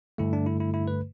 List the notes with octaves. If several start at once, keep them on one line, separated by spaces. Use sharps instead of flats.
G2 D3 A3 E4
D4
E4
E4
E4
B4